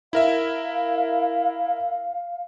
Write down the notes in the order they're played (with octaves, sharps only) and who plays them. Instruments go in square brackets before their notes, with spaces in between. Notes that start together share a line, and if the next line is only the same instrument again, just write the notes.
[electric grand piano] E4 A#4 E5 [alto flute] F5